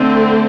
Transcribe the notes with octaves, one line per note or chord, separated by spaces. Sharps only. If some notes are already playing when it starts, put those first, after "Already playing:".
Already playing: D3 A3 C4